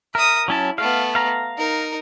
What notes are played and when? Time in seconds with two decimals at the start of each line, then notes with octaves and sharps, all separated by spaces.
0.15 A#4 E5 D#6
0.48 F#3 C#4 E4 A5
0.78 A3 B3 F5
1.15 F5 A#5
1.58 D#4 A#4